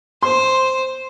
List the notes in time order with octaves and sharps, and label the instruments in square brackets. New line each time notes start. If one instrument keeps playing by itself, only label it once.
[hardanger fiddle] C5 [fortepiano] C6